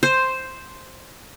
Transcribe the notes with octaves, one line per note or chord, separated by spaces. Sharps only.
C5